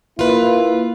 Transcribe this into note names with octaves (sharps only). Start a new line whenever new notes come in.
A#3 E4 F4 B4